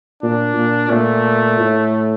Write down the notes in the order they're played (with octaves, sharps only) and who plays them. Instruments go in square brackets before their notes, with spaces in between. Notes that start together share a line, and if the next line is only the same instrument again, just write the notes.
[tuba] A#2 [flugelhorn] D4
[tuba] A#2
[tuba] A#2 [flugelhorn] A3
[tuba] A2